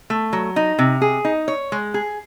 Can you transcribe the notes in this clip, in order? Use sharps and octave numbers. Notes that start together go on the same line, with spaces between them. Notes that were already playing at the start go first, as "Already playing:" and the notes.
A3
F#3
D#4
C3
G#4
D#4
C#5
G#3
G#4